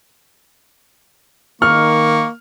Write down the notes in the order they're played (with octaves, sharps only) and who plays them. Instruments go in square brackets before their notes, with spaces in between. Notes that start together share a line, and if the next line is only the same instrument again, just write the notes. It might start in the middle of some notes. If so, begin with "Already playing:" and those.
[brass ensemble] D#3 [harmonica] A#3 [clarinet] C#6 [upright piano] F6